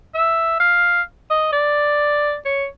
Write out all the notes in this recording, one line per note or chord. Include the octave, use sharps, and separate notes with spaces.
E5
F5
D#5
D5
C#5